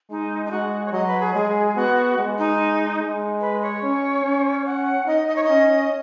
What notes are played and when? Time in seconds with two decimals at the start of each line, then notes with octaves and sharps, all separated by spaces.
0.10 G#3 D#4
0.46 D#4
0.51 G#3 F#4
0.86 C#5
0.92 F#3 D#5
1.07 B4
1.20 G#4
1.34 G#3 G#4
1.76 B3 F#4
2.18 G#3
2.38 D#4
3.00 G#3
3.41 B4
3.62 C#5
3.83 C#4
4.24 C#4
4.65 F#5
5.07 D#4 D#5
5.28 D#5
5.36 C#5
5.43 D#5
5.49 C#4